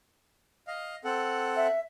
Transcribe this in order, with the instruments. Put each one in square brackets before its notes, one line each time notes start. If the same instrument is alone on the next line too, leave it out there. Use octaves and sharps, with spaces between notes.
[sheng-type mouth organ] D#5 F5
C4 A4 F#5
[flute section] E5